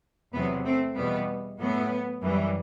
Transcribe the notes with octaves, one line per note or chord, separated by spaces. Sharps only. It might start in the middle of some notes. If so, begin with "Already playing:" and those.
E2 C3 F#3 B3
A3 C4
E2 B2 G3 B3
A2 F#3 B3
F#2 E3 G3